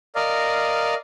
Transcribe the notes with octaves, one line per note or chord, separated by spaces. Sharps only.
A#4 D5 D#5 F5